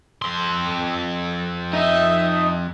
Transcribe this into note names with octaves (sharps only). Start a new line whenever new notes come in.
F2 C6
D#4 E5